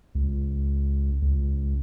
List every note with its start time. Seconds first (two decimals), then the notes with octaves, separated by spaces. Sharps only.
0.15 C#2
1.22 C#2